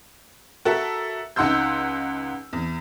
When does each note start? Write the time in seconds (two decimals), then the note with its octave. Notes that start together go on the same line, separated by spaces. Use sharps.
0.65 F#4 A4 A#4 E5
1.36 C#2 D#4 F#5 C6 E6 G6
2.53 E2